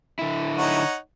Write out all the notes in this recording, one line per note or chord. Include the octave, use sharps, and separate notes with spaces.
D3 E4
D#4 C#5 F#5